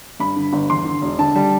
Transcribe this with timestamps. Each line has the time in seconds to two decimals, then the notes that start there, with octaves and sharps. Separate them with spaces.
0.20 G2 B5
0.36 D3
0.53 G1
0.70 E2 C6
0.85 D3
1.02 E1
1.19 D3 A5
1.35 G3